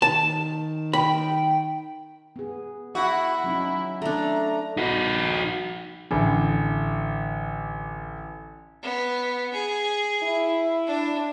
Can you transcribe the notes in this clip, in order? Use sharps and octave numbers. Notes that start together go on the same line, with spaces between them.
D#3 A5
G5 B5
B3 G#4
E4 F#4
F#3 C#4 D#4
A3 D4 A#5
D#4 F#4
A1 D3
B3
G#4
E4
D4